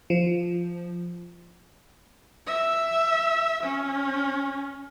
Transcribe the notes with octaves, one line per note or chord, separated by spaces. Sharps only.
F3
E5
C#4